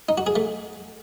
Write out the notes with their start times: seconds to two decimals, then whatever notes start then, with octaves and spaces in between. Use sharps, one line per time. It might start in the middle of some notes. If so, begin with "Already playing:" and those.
0.09 D#4
0.18 F#4
0.27 G#4
0.36 A3